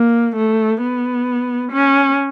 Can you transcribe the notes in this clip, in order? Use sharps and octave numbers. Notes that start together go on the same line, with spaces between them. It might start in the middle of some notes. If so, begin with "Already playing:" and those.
Already playing: A#3
A3
B3
C#4